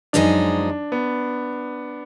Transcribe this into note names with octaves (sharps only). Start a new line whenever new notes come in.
F#2 F3 G#3 D4 D#4 G#4
B3